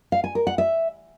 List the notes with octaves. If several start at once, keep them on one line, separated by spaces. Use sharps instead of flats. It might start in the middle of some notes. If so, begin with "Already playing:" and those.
F5
G#5
A#4
F#5
E5